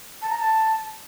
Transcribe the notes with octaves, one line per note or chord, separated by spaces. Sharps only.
A5
A#5
A5